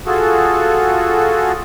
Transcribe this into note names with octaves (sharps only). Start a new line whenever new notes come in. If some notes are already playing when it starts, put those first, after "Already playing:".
F4 F#4 G#4 A4